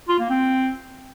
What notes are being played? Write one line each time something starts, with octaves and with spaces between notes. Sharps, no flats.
F4
A#3
C4